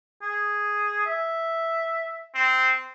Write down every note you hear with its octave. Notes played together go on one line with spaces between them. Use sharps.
G#4
E5
C4